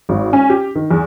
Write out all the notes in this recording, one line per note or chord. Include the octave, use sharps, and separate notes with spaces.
G#1
C#4
G4
D#3
E2